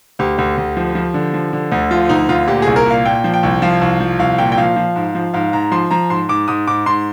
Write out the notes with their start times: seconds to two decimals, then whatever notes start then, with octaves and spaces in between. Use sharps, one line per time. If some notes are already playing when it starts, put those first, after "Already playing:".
0.19 D2 G4
0.38 D2
0.58 D2
0.77 F3
0.95 F3
1.14 D3
1.34 F3
1.53 D3
1.72 D2
1.91 F3 F4
2.09 D2 D#4
2.29 D2 F4
2.47 A#2 G4
2.62 C2 G#4
2.76 A#4
2.86 A#2 F5
3.05 A#2 G5
3.24 F3
3.34 G5
3.43 C2
3.62 F3 F5
3.81 C2
4.00 F3
4.19 C2 F5
4.38 A#2 G5
4.52 G5
4.57 F3 F5
4.76 F3
4.96 G#2
5.15 F3
5.34 G#2 F5
5.53 G#2 A#5
5.72 F3 C6
5.91 F3 A#5
6.10 G#2 C6
6.29 G#2 D6
6.48 G#2 D#6
6.67 G#2 D6
6.86 G#2 C6